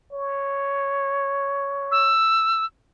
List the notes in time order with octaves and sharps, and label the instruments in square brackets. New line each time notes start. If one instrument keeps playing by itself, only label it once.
[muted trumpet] C#5
[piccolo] E6